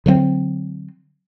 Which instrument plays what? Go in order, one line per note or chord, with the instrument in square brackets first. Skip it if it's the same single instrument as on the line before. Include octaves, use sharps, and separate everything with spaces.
[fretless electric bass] D3 F#3 A#3 C4